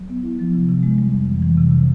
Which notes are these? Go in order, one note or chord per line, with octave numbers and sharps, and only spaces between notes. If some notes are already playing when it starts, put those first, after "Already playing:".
Already playing: F#3
B3
E4
F3
C3
C3
G#3
G3
F2
E3
E3
C3
C3